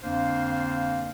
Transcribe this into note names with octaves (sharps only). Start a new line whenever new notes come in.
F2 D3 A#3 D4 C5 F5